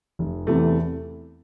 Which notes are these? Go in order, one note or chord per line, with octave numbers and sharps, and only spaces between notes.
F1
E2 C3 E3 A3